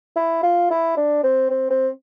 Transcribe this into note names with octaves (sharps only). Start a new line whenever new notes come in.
E4
F4
E4
D4
C4
C4
C4